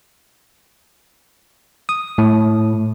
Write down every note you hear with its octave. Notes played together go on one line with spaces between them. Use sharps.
D#6
A2